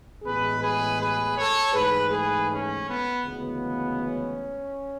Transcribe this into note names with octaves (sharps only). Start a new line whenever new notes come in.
A1 A2 G#3 B3 G#4 B4
G#4 B4
G#4 B4
A4 C#5
G#2 E3 A3 G#4 B4
G#4 B4
C#4
B3
D2 C#3 E3 G#3 B3
C#4